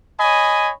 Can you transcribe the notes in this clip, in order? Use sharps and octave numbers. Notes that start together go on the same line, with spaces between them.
C#5 D#5 G#5 B5